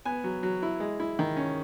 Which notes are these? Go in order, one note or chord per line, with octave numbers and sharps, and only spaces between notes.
B3 G#5
F#3
F#3
E4
G#3
E4
D#3
C#4